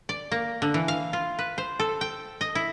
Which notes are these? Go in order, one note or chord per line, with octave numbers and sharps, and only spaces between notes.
D5
A#3
D3
E3
F5
F4
B4
C5
A4
G5
D#5
E4